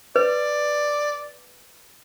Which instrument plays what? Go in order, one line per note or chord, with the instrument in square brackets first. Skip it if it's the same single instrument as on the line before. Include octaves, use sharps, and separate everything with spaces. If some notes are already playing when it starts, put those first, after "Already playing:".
[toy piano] B4 [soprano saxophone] D5